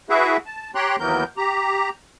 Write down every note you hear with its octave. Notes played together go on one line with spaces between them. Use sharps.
E4 F#4 G#4 B4 E5
A5
G4 C#5 G5 A#5 C6 F#6
D#2 E3 F#3 B3 A#4 G6
G4 A#5